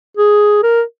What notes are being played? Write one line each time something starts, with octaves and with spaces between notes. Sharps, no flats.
G#4
A#4